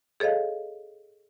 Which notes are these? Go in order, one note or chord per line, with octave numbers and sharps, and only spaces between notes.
G#4 A4 C#5 D#5 F5